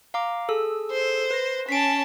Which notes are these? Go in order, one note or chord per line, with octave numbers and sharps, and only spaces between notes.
F5 A#5 D6
G#4 A4 E6
C5
B4 A#6
C#4 A5 B6 C7 D7